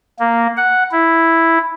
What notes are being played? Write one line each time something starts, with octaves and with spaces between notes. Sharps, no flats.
A#3
F#5
E4